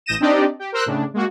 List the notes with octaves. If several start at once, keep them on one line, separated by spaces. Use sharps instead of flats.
A1 D#6 G6 A#6 D#7 E7
C4 D4 D#4 G4 D5 D#5
G4
A#4 C5 E6 F#6
A2 C#3 D4
G#3 A#3 F#4